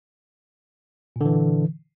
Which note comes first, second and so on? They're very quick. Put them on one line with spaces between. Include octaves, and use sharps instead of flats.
A#2 D3 E3